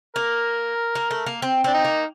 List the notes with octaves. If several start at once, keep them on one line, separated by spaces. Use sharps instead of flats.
A#3 A#4
A#3
A3
A#3
C4
C4 D4
D#4
A#3